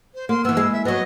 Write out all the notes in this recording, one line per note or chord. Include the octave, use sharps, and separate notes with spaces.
C5
A#3 C6
E3 B3 E6
G#3 E4
E5
F#3 B3 D#5